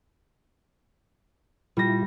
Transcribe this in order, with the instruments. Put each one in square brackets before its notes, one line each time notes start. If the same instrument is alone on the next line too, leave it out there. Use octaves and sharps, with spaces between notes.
[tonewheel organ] A#2 E4 F4 [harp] G3 A#6